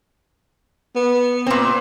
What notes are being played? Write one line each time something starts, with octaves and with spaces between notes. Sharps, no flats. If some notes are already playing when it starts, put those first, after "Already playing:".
B3
A#2 C4